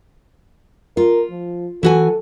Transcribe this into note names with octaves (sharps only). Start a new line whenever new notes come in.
F4 A#4
F3
E3 F#4 A4 G#5